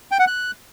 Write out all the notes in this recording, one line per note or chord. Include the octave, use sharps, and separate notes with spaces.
G5
F#5
F#6